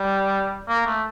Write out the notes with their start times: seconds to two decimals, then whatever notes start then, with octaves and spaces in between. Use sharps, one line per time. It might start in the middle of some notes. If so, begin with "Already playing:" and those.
Already playing: G3
0.68 A#3
0.86 A3